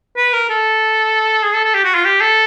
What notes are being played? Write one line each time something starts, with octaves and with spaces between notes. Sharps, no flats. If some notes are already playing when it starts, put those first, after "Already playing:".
B4
A#4
A4
G#4
A4
A4
G4
F#4
F4
G4
A4